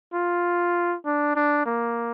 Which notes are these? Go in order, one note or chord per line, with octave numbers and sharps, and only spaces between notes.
F4
D4
D4
A#3